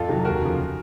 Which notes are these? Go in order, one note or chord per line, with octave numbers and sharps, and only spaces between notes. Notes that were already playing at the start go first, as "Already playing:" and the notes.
Already playing: F2 F4 A4
C3 D#3 F#3
D#2 F#4 A#4
C#3 F3